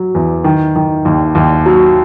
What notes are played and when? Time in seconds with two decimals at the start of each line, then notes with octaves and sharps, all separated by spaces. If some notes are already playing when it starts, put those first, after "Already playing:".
Already playing: F#3
0.15 E2
0.44 D#3
0.76 D#3
1.05 D#2
1.35 D#2
1.66 F#3